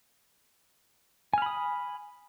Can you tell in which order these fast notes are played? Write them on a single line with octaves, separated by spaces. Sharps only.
G#5 F6 B5 D#6